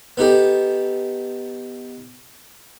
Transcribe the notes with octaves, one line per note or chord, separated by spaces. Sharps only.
B3 D#4 G4 A4